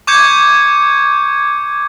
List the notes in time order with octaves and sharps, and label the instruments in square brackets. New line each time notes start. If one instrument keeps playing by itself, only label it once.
[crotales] C#6 D6 G6 G#6 C#7